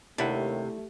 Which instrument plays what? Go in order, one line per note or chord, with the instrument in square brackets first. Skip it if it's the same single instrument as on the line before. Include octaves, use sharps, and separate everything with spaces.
[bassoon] D#2 [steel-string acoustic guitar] C3 [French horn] A3 [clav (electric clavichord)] D4 E4 F#5